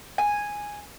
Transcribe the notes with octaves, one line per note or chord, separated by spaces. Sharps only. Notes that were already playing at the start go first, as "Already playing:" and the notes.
G#5